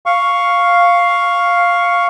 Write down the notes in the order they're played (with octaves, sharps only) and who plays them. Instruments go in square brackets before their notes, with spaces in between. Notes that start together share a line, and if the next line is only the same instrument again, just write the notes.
[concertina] F5 C#6